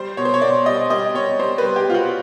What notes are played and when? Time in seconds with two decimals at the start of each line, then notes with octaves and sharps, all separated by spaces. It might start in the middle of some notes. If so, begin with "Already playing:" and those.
Already playing: G3 C5
0.17 B2 C#5
0.25 C5
0.34 C#5
0.42 B2 D5
0.66 G3 D#5
0.90 G3 D#5
1.15 G3 C#5
1.39 G3 C5
1.58 B4
1.64 G3
1.76 G4
1.89 G3 F4
1.94 F#4